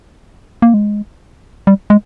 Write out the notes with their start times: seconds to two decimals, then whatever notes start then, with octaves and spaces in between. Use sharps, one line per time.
0.62 A#3
0.74 G#3
1.67 G3
1.90 G#3